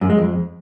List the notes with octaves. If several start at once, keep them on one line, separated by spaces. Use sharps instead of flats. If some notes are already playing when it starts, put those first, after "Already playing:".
F#2
G#3
F2